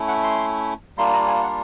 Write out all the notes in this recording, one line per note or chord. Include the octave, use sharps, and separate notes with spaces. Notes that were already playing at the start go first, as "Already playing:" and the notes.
Already playing: A3 C#4 E4
F#5
C6
G3 A#3 D4 F4 C6
A#5
G#5
F#5